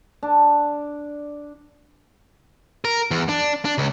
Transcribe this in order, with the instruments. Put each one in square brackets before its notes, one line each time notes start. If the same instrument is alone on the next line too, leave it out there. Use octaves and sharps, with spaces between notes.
[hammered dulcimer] D4
[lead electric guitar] A#4
E2
D4
D4
C#2